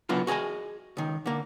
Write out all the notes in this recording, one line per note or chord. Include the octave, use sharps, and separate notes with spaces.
C#3 F#3 B3 D4 E4 F4
F#4 G#4 A#4 D#5 G#5
C#2 D#3
D3 A#3